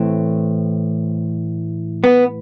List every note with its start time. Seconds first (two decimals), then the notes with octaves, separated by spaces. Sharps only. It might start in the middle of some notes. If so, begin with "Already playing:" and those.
Already playing: A2 E3 A3 C4
2.04 B3